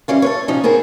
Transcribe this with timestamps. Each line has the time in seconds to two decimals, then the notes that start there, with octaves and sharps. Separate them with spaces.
0.08 E3 G3 C#4 F5
0.22 A4 B4 C#5
0.48 C3 F3 C#4 D#4
0.64 B3 C4 G#4 A#4